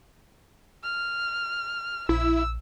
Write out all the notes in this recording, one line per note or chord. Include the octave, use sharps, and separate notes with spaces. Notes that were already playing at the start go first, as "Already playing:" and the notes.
F6
A#1 E4 E6